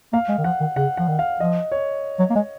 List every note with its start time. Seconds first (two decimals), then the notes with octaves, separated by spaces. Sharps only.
0.13 A#3 F5
0.29 G#3
0.38 D#3
0.44 F3 F#5
0.61 D#3
0.76 C#3 F#5
0.97 F3 F#5
1.08 D#3
1.19 F5
1.40 F3 D#5
1.72 C#5
2.19 F#3
2.30 A#3
2.36 G#3